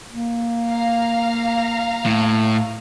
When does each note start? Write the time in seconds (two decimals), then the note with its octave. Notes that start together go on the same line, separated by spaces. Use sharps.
0.10 A#3
0.67 F5 A#5 F6
2.06 A2